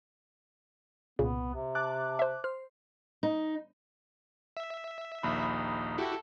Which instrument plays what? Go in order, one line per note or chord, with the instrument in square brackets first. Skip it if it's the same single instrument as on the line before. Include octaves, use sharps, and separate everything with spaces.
[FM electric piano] C2 [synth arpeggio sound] A#2 C#3 [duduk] B3
[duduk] C3
[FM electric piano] A5 D6 F#6
[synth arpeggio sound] C5 E5
[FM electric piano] C5 [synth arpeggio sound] F6
[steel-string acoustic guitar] D#4
[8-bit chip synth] E5
[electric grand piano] A#1 D#2 B5 [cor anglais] D#4
[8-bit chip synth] E4 F#4 G4 [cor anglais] A4